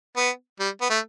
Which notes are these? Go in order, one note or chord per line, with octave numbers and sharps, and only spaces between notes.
B3
G3
B3
A3